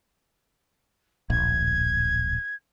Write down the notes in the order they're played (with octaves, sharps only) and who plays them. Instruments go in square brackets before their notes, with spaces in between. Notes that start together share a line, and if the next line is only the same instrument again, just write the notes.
[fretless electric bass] D1 A#1 [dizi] G#6